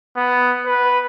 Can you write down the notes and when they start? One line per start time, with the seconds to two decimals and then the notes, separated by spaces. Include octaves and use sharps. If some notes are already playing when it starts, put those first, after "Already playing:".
0.16 B3
0.66 B4